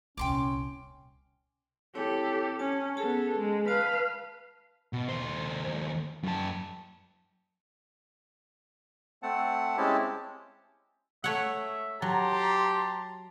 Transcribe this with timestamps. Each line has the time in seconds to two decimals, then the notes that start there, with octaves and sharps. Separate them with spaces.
0.17 D#1 C2 C#4 G5 C6 D6
1.95 C4 E4 G4 A4 C#5
2.59 C#4 A5
2.97 B3 C#4 G#4 A4 A5
3.39 G#3
3.68 B4 F5 A5
4.93 B2
5.09 D#2 C5
6.23 F#2 A5
9.23 A3 C4 F#5 A5
9.77 G#3 C4 C#4 E4 G4 A5
11.24 A3 C#5 E5 F#5
12.02 F#3 G4 A5 A#5 C6